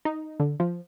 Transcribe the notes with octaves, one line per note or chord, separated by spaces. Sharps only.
D#4
D3
F3